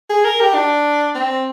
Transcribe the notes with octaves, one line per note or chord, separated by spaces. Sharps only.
G#4
A#4
G4
D4
C4